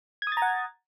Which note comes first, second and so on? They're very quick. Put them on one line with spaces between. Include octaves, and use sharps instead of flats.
G#6 D#6 A6 A#5 F#5